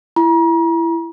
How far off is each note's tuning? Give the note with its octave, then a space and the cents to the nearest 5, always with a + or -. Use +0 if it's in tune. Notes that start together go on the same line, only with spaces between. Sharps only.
E4 +20 A#5 +40